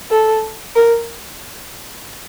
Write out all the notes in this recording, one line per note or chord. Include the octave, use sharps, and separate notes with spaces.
A4
A#4